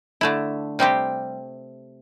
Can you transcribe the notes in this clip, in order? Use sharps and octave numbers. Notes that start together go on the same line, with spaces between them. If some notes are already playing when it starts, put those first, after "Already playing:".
D3 A3 E4
C3 G3 C4 G4